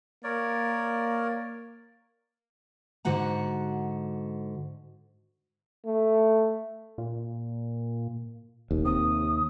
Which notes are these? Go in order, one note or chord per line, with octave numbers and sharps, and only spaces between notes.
A#3 A#4 C#5 D5
G#2 D3 F#4 F#5 A#5
A3
A#2
D#1 D#2
C3 D#6